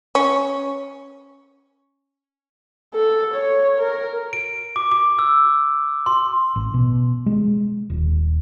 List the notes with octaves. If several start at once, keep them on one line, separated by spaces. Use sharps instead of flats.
C#4
A4
C#5
A#4
D7
D6
D6
E6
C6
A1
B2
G#3
D#1